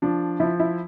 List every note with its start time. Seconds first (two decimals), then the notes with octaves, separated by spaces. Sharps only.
0.02 F3 D4
0.40 F3 E4
0.59 E4